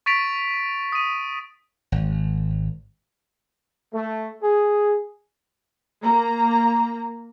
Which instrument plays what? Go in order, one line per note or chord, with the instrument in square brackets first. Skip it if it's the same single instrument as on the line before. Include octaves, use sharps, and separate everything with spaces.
[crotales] C#6 A6 B6 D7 F7
D#6 D#7
[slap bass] G#1
[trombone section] A3
G#4
[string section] A#3 A#5